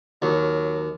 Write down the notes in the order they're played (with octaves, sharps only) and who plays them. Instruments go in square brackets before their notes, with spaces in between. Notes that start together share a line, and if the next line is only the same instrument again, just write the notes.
[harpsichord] D#2 [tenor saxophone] F#3